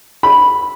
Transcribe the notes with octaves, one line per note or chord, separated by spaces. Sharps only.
B5